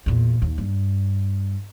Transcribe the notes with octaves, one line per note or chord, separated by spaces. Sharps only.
E2 A#2
D#2
G2